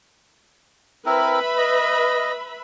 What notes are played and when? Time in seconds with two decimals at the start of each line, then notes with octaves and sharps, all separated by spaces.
1.06 C4 E4 A#4 B4 E5 B5
1.57 D#5